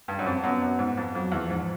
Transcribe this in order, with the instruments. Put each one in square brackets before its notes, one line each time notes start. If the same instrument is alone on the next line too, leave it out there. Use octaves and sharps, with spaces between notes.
[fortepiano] G2
F#2
[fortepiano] F2 [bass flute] C4
[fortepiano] F#2 [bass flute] B3
[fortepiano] F#2
G#2
F2
[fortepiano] F2 [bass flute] F#3
[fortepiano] E2
[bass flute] F3
[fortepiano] G#2